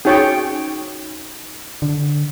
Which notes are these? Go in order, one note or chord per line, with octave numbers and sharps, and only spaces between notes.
C#4 D#4 F#4 G#4 C#5 G5
D3